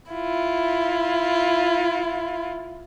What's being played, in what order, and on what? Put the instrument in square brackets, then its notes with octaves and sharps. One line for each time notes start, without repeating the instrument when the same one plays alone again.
[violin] E4 F4